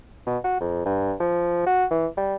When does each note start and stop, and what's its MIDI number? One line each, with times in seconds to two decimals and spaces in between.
0.26 0.38 47
0.44 0.60 66
0.61 0.84 41
0.86 1.14 43
1.20 1.62 53
1.66 1.85 66
1.91 2.07 52
2.18 2.36 55